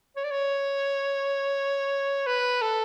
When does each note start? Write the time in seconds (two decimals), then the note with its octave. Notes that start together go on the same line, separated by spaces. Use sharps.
0.16 C#5
0.24 D5
0.31 C#5
2.27 B4
2.62 A4